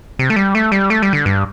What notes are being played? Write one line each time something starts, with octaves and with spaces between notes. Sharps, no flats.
C3
A3
G3
A3
G3
A3
G3
D3
G2